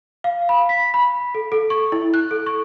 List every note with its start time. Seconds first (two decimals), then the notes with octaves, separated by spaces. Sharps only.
0.24 F5
0.49 B5
0.69 B6
0.94 B5
1.35 A4
1.52 A4
1.70 C#6
1.92 E4
2.14 F#6
2.31 A4
2.46 C#6